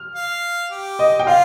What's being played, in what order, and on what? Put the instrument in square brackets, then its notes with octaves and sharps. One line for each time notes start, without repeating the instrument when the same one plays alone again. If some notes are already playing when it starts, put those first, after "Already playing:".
Already playing: [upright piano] F6
[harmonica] F5
G4
[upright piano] D#5
G5
[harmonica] F4 [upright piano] F5